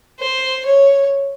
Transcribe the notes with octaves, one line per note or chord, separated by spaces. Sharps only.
C5
C#5